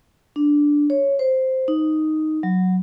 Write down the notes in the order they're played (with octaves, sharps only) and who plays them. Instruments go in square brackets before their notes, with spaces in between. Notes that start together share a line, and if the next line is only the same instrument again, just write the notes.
[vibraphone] D4
C#5
C5
D#4
F#3